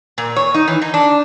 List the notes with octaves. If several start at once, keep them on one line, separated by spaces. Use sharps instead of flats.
A#2
C#5
D#4
E3
D#4
D4